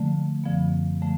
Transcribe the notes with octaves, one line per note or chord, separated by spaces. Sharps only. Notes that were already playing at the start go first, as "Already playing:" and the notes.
Already playing: D3 F3 A3
F#2 D3 F3 B3
D3 F3 A3